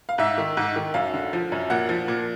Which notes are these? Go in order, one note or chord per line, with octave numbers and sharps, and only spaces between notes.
F5
G#2 E5
D#3
G#2
D#3
F#2 F5
D3
F3
F#2
A#2 F#5
F3
A#2